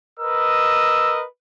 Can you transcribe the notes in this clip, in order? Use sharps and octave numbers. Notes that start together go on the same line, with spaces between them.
A#4 B4 D#5 E6